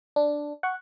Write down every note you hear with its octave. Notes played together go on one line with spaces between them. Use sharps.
D4
F#5 C#6